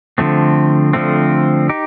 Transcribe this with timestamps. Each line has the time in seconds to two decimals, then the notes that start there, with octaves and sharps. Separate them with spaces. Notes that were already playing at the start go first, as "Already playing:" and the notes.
0.18 D3 F3 A3 C4
0.93 D3 F3 A3 C4
1.69 D#4 G4